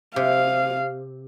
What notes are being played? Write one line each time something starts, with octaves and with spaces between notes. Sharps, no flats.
C3 F5